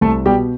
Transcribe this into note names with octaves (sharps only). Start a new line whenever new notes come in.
C2 A3 A4
B2 G3 G4